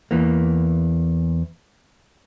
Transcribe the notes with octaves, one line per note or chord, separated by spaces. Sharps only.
E2 E3 A#3